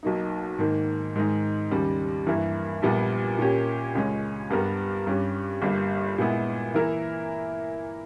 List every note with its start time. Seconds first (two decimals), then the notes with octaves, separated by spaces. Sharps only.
0.03 B1 B2 A#3 D#4
0.59 G#2 D#3 A#3
1.15 G#2 D#3 G#3 D#4
1.71 D#2 C#3 G3
2.27 G2 E3 A#3 E4 A#4
2.82 A#1 A#2 G3 B3
3.39 A#2 A#3 C#4 G4
3.95 C#2 C#3 G#3 C#4
4.50 G2 G3 B3 G4 A#4
5.07 G2 G3 C#4 G4
5.62 G1 G2 G3 A#3
6.18 A#2 G#3 B3 E4
6.74 E3 A#3 E4 A#4